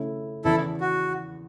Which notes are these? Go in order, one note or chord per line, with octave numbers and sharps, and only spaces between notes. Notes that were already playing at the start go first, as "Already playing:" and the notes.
Already playing: C#3 A3 C#4 E4
E2 C#3 E3 E4 A4
F#4